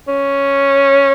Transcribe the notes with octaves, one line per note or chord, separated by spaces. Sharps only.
C#4